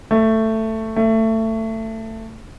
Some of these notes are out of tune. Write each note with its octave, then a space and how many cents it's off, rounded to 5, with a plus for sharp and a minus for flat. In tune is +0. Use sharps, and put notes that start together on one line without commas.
A3 +10
A3 +20